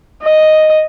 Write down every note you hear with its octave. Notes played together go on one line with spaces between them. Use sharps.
D#5